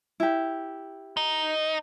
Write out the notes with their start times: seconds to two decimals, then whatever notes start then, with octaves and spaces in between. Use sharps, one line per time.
0.20 E4 G4
1.17 D#4